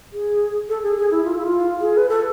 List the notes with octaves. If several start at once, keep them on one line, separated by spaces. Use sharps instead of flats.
G#4
A4
G#4
G#4
E4
F4
E4
F4
G#4
B4
A4